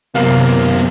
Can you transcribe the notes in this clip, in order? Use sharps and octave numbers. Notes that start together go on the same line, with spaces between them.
F#2 C3 A#3 B3 F5